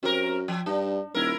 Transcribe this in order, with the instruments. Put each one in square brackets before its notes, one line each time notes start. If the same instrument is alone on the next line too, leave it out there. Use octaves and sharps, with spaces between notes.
[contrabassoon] F#2 [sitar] C4 G4 A#4
[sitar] F3
[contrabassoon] G2 [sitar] D4
[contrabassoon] D#1 [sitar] E4 A#4